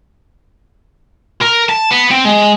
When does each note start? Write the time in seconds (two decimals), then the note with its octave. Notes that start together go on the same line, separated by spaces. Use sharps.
1.41 A#4
1.69 A5
1.91 B3
2.11 C4
2.25 G#3